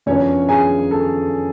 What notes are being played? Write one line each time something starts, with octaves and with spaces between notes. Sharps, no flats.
F#2 C#3 F3 B3 C#4 D4 C#5
G#4 G#5
A4 A5